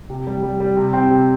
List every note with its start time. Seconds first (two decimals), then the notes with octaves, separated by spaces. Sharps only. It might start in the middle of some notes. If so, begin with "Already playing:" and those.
0.10 C3
0.27 G3
0.43 G3
0.60 G3
0.77 C3
0.93 C4
1.10 C3